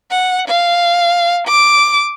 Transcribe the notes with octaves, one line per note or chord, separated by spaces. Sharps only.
F#5
F5
D6